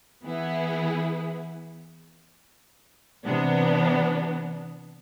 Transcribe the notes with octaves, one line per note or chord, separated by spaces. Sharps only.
E3 B3 E4 G#4
C3 E3 B3 D4